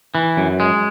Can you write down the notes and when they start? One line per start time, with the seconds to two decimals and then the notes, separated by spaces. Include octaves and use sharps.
0.15 E3
0.37 F#2
0.60 G#3